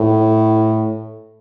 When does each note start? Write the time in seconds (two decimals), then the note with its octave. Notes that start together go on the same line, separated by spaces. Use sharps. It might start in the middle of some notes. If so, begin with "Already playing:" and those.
Already playing: A2